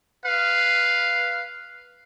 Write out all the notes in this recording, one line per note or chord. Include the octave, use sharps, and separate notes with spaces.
B4 F5